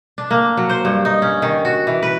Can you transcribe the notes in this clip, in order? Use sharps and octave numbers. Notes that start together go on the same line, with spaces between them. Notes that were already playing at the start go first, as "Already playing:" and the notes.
D4
A#3
F#3
C5
G2
D#4
C#4
D#3
F#4
E3
B4